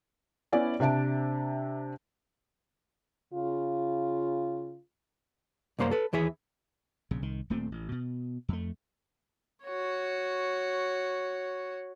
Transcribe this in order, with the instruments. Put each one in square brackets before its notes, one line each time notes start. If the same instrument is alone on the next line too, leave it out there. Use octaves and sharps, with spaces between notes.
[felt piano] B3 C#4 E4 D5 E5 G#5
C3 D4 E5 A5 D7
[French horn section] C#3 F4
[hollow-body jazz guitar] C2 F#2 A#3 C5 A#5
A4 B4
D#2 E3 G#4 E5
[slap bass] A#1 C#3
C2 D#3
D#1 A#2 A3 C4
A1
B2
F2 A3
[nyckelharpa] F#4 C#5